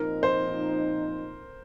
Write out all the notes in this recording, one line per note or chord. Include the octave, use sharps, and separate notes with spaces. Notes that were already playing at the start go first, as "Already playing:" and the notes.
Already playing: A#2 F3 C4 D#4 A#4
C5